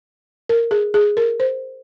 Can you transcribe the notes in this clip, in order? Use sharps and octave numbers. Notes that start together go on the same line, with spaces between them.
A#4
G#4
G#4
A#4
C5